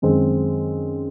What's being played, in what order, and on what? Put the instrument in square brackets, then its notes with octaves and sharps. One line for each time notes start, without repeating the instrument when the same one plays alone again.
[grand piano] F#2 D#3 G#3 C4